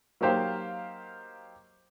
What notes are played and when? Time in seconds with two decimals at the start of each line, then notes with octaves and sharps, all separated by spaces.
0.21 F#3 A#3 D#4 G4 C5 F5